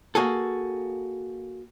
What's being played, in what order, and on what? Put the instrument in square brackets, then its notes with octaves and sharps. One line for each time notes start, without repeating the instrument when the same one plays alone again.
[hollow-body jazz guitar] A#3 F#4 G#4 A4